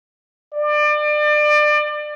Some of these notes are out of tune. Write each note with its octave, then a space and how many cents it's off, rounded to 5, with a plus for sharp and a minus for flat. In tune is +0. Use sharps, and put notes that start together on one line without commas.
D5 +30